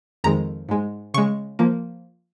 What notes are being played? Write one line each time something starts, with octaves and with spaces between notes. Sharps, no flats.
F2 D#3 G#3 A#5
G#2 G#3
C#3 G#3 C#6
F3 A#3